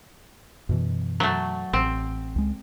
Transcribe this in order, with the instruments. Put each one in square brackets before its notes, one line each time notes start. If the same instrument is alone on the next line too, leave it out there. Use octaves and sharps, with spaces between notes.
[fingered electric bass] F#2 B2 E3
[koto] F#3 A3
[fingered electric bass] A1 [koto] C4
[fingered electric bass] C#2 G#3